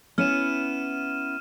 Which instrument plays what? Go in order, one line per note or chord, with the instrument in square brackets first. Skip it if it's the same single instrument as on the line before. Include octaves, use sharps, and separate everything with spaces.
[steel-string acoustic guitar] B3 C#4 E4 [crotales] F6 D#7 E7